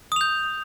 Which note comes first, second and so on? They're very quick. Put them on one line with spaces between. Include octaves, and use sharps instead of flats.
D#6 F7 G6